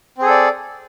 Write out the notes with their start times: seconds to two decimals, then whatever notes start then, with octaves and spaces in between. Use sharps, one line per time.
0.18 C4
0.22 G#4
0.26 A4
0.30 D5